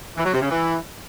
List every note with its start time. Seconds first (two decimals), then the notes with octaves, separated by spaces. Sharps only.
0.17 E3
0.25 F#3
0.34 C3
0.42 C#3
0.50 E3